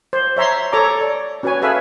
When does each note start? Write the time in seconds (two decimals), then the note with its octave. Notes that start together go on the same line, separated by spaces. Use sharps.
0.13 C5
0.37 C#5 E5 A#5 C6
0.72 A4 C#5 A#5 D6
1.01 D5
1.43 C#4 F#4 B4 C#5 G#5
1.62 G#4 A4 B4 E5 F5 G#5